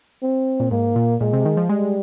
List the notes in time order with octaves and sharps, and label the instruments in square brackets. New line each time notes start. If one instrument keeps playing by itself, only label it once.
[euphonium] C4
[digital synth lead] A#2
[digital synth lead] G#2 [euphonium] A#3
[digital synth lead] A#2
[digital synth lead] A#2 [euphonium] G#3
[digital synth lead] C3
D#3
F3
[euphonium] G3 [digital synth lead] G#3